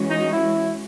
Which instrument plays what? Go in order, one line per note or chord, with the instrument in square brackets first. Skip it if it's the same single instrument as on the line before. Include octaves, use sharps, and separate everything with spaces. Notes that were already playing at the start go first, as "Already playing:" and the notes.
Already playing: [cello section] E3 G#3 C#4 F#4
[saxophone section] D#4
E4